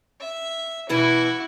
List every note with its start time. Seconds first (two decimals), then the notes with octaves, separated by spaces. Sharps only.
0.20 E5
0.90 B2 E3 E4 F#4